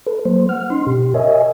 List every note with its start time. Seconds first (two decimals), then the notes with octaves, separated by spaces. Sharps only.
0.07 A4 B4
0.25 F#3 A#3 C5
0.49 F#5 F6
0.70 C#4 D#4 C6
0.87 B2 G4
1.14 A#4 C#5 D#5 E5 G#5